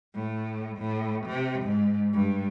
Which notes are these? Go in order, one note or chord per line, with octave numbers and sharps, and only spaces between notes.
A2
A2
C3
G#2
G2